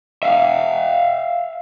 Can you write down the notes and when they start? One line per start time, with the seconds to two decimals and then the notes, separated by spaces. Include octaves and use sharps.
0.23 E5 F5